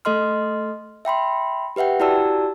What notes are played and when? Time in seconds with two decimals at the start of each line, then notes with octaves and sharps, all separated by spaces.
0.05 A3 A4 D#5 C6 F6
1.05 E5 G5 B5 C6
1.76 G4 B4 E5 F#5 G5
2.00 E4 F#4 G4 D5 A5 E6